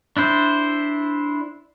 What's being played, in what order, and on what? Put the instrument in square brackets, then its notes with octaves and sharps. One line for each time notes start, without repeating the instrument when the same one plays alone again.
[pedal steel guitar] D4 E4 C5